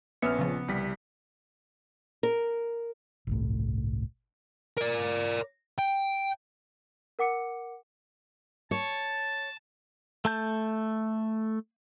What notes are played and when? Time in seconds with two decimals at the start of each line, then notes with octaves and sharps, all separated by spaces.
0.22 A#1 B3 C#4 E5 F6 C#7
0.39 C#3 F3
0.68 C2 G3 B6
2.23 A#4
3.27 G1 C2 A2
4.77 A#4 D5
5.78 G5
7.19 A#4 F#5 D6 C#7
8.71 C#5 A5
10.25 A3 A5 G6